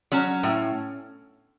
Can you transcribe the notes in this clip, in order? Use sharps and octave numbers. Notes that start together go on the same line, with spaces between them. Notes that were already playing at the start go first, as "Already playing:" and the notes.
F#3 C#4
A2